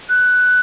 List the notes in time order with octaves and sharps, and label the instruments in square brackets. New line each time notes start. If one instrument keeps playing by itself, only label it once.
[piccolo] F#6